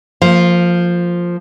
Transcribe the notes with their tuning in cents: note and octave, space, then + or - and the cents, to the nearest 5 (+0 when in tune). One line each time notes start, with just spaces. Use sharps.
F3 +0 A#3 -30